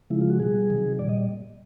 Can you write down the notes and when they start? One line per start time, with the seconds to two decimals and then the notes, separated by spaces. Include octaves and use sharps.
0.10 C#3 F3 G#3 E4
0.21 F4
0.30 F#4
0.40 B2 G3 G#4
0.70 C3 D#3 F#3
0.99 A#2 G3 D5
1.09 D#5